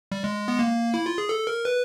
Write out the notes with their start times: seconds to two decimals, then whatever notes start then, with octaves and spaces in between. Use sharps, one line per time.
0.12 G3
0.24 G#3
0.48 B3
0.59 A#3
0.94 E4
1.06 F4
1.18 G#4
1.29 A4
1.47 A#4
1.65 B4